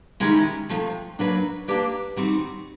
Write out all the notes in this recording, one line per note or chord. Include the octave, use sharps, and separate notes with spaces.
D#3 G#3 C#4 E4 G4
C3 F3 A3
F#3 A#3 D4 F#4 B4
A#3 D4 G4 B4 D5
D#3 G3 C4 D#4 F#4